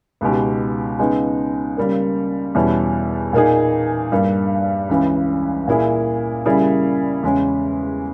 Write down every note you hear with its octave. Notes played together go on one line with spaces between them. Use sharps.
C#2 B2 G#3 D#4 G4
C#3 G#3 B3 D#4 G#4
C#3 G3 A#3
E2 B2 G3 C#4 E4
A#2 A#3 D#4 G#4
G2 G3 A#3
C#2 C#3 E3
A#2 A#3 E4 G#4
C#3 G3 A#3 E4 G#4
E2 C#3 G#3 C#4